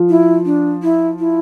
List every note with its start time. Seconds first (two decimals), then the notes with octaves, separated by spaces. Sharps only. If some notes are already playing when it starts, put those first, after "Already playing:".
Already playing: F3
0.09 E4
0.45 D4
0.83 E4
1.19 E4